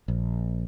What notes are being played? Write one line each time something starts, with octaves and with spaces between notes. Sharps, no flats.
A#1